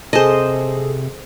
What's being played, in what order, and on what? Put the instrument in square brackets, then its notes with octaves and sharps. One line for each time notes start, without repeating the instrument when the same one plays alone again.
[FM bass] C3 [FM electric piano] G#4 A4 [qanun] C5 D#5